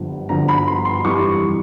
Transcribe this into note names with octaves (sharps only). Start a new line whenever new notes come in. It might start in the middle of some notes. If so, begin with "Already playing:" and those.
Already playing: G1 G2 D3 F3
G1 G2 D3 F3 A#5
B5
C6
C6
F2 C3 E3 G3 C#6